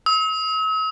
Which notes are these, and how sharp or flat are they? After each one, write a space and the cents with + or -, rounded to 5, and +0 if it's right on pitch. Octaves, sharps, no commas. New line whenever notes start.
E6 -45